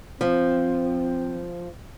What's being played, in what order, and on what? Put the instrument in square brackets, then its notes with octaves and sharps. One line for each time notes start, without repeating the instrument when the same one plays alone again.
[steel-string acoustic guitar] F3 [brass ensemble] C4